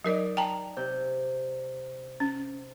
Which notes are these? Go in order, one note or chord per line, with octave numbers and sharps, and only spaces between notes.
F#3 D#4 A#4 D5 D#5
G5 A5 A#5
C3 G6
C#4